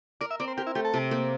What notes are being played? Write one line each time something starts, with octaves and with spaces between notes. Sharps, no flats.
A#4 D5
E5
C4 D5
C5
G4 A#4
E4
A3 G4
A4
C3
A#3